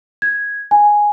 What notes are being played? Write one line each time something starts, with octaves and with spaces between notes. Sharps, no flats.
G#6
G#5